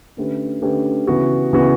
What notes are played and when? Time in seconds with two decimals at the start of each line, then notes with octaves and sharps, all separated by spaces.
0.17 D3 A3 C#4 G4 B4
0.61 D3 A3 C#4 G4 B4
1.07 C#3 E3 B3 F#4
1.53 C#3 E3 B3 F#4